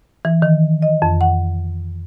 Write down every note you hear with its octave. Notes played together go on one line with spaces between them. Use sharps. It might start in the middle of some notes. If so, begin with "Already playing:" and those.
E3
D#3
D#5
F2
F#5